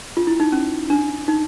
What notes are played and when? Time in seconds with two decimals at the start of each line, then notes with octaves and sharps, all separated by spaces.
0.17 F4
0.27 E4
0.40 D#4
0.52 C#4
0.90 D4
1.28 D#4